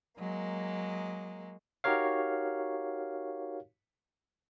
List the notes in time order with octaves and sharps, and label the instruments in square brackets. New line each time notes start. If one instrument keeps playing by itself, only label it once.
[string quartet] F#3 G#3 A#3
[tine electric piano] D#4 F#4 G4 A#4 C#5 F5